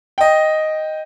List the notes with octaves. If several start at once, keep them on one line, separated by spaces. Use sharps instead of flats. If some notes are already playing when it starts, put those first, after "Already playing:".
D#5 G5